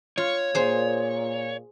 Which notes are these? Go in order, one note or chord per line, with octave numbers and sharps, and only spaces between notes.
F4 C#5
A#2 G#4 C5